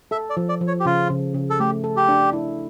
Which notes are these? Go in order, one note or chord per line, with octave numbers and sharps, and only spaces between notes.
A4 E5
D5
F3
D5
F3
C#5
G4
C#3 F4
C#3
C#3
A4
A3 G4
A4
G4
D4
E4